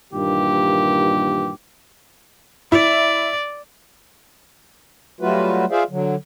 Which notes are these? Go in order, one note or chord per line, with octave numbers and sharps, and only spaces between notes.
G2 A#2 D#3 E3 A#3 G4
E4 D5
F#3 G3 A3 F4 F#4 B4
F4 G#4 C5 D5 E5 F5
D3 F#3